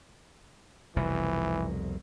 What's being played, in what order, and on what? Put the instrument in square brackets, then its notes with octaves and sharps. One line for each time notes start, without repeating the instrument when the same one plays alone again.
[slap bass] F1 C2 B2 [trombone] E3